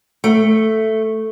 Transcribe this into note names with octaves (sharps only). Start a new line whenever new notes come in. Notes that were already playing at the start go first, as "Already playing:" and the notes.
A3